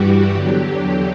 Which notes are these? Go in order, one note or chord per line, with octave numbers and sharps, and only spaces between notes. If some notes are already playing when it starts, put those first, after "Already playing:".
Already playing: G2 E3 G3 F#4 G4
E2 D3 F#3 G4